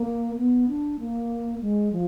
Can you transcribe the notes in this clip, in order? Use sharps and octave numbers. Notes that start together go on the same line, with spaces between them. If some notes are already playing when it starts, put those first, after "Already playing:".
Already playing: A#3
B3
D4
A#3
G#3
F3